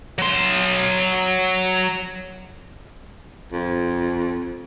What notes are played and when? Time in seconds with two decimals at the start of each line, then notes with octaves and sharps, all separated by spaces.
0.18 F#3 C6
3.52 F2